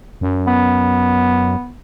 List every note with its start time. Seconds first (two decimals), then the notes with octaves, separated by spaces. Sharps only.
0.21 F#2
0.47 B3